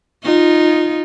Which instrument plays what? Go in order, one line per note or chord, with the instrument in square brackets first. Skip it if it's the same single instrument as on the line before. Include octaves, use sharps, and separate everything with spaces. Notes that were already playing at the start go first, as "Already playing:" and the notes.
[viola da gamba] D#4 F4